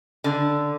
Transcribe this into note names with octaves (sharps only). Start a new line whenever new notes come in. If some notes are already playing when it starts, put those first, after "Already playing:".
D3